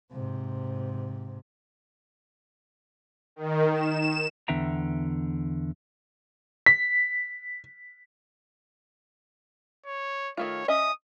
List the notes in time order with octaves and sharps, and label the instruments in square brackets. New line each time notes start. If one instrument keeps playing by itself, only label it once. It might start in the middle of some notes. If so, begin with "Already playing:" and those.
[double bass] G#2 C3
[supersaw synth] D#3
E7
[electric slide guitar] E2 D3 B3 E5 G5 A#5
[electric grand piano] B6
[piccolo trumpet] C#5
[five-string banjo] D#3 A3 F4 [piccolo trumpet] C#5
[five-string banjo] C#4 D#5 E5 [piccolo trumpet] D#6